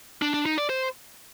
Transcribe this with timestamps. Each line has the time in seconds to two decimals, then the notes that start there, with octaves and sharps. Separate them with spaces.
0.22 D4
0.34 D4
0.46 D#4
0.58 D5
0.70 C5